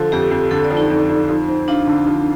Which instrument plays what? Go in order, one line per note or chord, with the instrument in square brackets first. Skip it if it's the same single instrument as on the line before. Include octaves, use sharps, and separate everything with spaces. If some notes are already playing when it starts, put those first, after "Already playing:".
Already playing: [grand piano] D3 F3 [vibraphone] A4
[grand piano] F2 [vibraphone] G4
[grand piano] F2
[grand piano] D3 [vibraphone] A4
[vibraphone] D5
[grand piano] F3
[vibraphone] D#4
[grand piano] F2
F2
F3
C4
[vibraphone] D4 [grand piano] F4
[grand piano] D3
F3